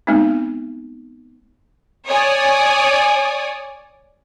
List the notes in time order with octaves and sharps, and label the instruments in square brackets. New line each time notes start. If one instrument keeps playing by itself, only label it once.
[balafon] G#3 A3 B3 C4 D#4
[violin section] C#5 D5 G#5 D#6